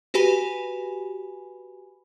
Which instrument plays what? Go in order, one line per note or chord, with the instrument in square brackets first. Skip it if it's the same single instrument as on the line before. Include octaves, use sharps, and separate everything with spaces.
[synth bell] F#4 G4 B4 G#5 B5